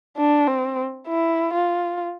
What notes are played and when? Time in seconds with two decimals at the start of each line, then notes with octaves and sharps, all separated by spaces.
0.17 D4
0.47 C4
1.08 E4
1.53 F4